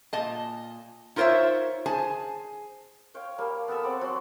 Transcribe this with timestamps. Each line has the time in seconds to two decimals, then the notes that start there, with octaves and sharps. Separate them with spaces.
0.13 A#2 D#5 A5
1.16 D#4 F4 A#4 C5 C#5 E5
1.86 G#4 C5 G#5 A5
3.14 C#5 F5 G5
3.38 G3 A#3 F5 A5
3.68 B3 A4 G#5 E6
3.83 C4 C#5 F#5 D6
4.01 F#3 F#4 G#5 C6